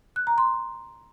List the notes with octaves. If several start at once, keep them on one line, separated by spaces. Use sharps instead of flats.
F#6
A#5
C6